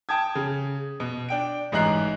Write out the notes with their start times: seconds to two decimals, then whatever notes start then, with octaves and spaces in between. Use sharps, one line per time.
0.09 G5 A5 D#6 G#6
0.35 C#3
1.00 B2
1.29 D4 G5 D7
1.72 A1 G#2 D#4 A#5 F#6 C7